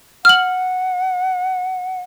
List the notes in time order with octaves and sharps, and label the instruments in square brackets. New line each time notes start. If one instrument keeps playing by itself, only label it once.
[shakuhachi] F#5 [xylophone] F6 F#7